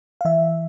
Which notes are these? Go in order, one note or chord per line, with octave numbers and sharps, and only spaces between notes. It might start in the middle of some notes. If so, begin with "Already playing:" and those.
F5
E3 E5